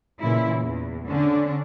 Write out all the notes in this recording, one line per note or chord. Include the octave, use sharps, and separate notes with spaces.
A#2 C#3 E3 E4
E2
D3 C#4 D4